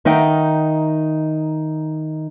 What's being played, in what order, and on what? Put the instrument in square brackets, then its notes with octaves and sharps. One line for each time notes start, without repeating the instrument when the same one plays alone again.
[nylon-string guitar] D#3 D#4 E5 F#5 G5